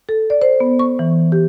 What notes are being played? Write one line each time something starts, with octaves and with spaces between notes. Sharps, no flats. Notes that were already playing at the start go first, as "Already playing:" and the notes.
A4
D5
C5
B3
C#6
E3
G4